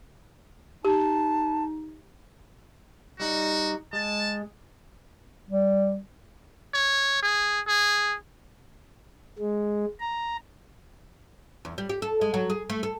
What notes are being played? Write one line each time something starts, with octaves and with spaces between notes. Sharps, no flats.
D#4 G4 A5
G3 D#4 F#4
G#3 A5
G3
C#5
G#4
G#4
G#3
A#5
E2
G3
G4
A4
G#3
F#3
G#4
A3
A4